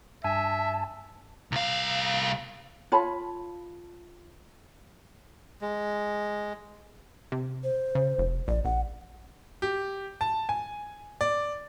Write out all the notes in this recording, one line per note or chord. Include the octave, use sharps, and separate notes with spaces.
G2 E5 G#5 A5
C2 F5
F4 C#5 A5 B5
G#3
C3
C5
C#3
F1
A#1 D5
A#1 F#5
G4
A5
G#5
D5